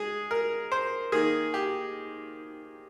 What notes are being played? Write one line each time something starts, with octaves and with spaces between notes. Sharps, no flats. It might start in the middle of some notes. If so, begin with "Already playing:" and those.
Already playing: G#3 G#4
A#4
C5
D#3 A#3 G#4
G4